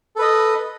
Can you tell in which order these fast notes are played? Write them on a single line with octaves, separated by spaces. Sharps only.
A4 B4 D#5